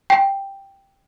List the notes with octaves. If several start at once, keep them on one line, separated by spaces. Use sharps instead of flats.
G5